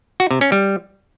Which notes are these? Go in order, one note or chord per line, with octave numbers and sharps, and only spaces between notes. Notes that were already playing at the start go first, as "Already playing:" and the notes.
F#4
C3
C#4
G3